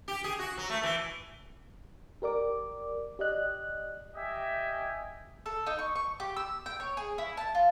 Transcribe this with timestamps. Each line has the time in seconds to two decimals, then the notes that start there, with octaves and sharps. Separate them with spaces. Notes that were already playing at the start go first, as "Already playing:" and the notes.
0.08 G4
0.24 G#4
0.39 F#4
0.57 F#3
0.69 A3
0.83 E3
2.22 G4 A#4 D5 D6
3.19 G4 D5 D#5 F#6
4.16 G4 D#5 E5 G#5
5.46 A4
5.66 D#4
5.79 C#6
5.96 C#6
6.20 G4
6.36 E6
6.66 G5
6.80 C#5
6.97 G#4
7.18 E4
7.37 A5
7.55 F4